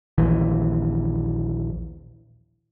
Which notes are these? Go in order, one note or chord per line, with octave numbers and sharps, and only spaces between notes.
A#1 D#2 E3